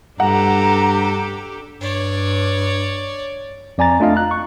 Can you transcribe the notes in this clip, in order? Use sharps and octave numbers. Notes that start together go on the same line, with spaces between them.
G2 D4 G4 A4 F#5 A#5
G2 C#5 D5
F2 D5 G#5 A#5 A6
A3 D4 F4 D#5 F5
A#5 F#6
C#6